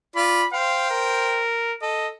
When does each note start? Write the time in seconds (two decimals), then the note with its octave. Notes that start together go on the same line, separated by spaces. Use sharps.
0.16 F4 D5 B5
0.53 C5 F5 G5
0.91 A#4
1.82 A4 D#5